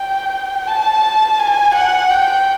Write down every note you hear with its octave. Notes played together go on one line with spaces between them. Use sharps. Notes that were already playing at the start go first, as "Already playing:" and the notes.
Already playing: G5
A5
G#5
F#5
G5